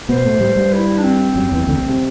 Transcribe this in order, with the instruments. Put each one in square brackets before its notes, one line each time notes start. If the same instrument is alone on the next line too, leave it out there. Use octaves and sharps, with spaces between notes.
[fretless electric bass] B2 B3 [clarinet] C5
[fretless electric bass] A2 A3
G2 G3
G2 G3
[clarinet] E4
D4
C4
[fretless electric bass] F#2 F#3
E2 E3
D2 D3
C2 C3
C3